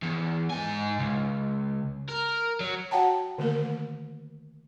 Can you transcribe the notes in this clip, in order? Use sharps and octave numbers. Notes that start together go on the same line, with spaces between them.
E2
G#2 G#5
C#2
A#4
F#3
F#4 C#5 F#5 G5 A5 A#5
D3 D#3 A3 A#3 A#4